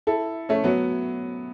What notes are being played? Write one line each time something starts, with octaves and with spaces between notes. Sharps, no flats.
E4 A4
A3 C#4
F#3 B3